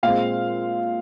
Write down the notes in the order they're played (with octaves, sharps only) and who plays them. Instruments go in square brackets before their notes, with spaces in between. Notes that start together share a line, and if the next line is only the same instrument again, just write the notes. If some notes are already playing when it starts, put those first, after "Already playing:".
[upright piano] A#2 G#3 C4 F5